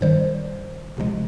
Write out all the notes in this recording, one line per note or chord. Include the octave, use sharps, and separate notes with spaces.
G2 D#3 G3 C5
C#2 C3 F3 G#3